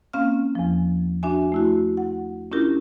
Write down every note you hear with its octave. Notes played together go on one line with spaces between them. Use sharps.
A#3 C4 C#4 F5 F6
E2 F3
D4 F#4 E5 G#5
A3 E4 F#4
F#5
C#4 D4 E4 F4 G4 A#4